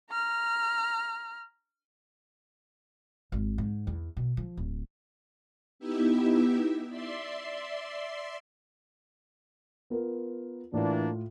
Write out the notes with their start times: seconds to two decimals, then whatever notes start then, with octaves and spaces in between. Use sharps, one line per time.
0.11 A#5 F6
3.32 G#1
3.58 G#2
3.87 E2
4.17 B2
4.37 F3
4.57 D1
5.79 B3 D#4 E4 G4 E5
6.89 D5 E5 C6
9.90 B3 F4 A#4
10.73 A2 E3 A#3 D4 F4